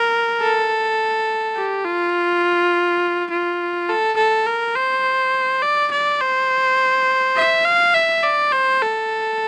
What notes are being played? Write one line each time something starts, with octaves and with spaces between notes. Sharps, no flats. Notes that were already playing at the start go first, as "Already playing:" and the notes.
Already playing: A#4
A4
G4
F4
F4
A4
A4
A#4
C5
D5
D5
C5
E5
F5
E5
D5
C5
A4